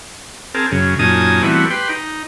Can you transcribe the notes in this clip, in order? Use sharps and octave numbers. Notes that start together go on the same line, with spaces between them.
C4 G#4 A#4 A5
F#2 C#3
F#2 A#2 D#4 G#5 A5 D#6
E3 G3 A3 B3 C4 F#4
G4 B4 G5 C6
D#4